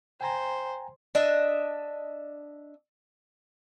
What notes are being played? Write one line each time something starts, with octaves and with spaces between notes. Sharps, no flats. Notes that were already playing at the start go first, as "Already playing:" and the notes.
C5 G5 G#5 A#5
D4 D#5 E5